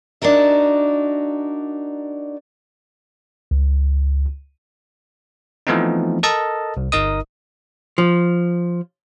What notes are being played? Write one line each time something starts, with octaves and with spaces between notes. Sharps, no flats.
D4 D#4 F#4 A#4 E5
C#2
E3 F3 A3 B3 C4 D#4
A4 A#4 D#5 A5
C2
G1 D#4 A#4 D#5 D#6
F3